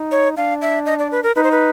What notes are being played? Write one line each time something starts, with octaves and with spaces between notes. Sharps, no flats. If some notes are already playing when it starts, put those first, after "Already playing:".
Already playing: D#4
C#5
D4 F5
E5
D#5
D5
B4
A#4
D#4 B4
C5
B4